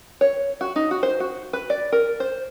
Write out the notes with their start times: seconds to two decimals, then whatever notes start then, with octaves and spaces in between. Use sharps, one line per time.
0.21 C#5
0.61 F#4
0.76 D#4
0.91 F#4
1.03 C5
1.20 F#4
1.53 B4
1.70 D5
1.92 A#4
2.20 C5